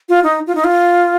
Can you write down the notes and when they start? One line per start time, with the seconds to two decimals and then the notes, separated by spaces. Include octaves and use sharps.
0.09 F4
0.24 D#4
0.47 F4
0.55 D#4
0.64 F4